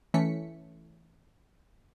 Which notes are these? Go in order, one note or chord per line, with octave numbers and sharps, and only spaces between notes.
E3 A3 C#4 B6 C#7